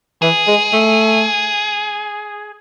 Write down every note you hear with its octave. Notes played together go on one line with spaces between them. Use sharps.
E3 G#4
G#3
A3